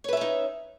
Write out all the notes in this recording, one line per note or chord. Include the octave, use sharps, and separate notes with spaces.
C#4 D#4 B4 C#5 E5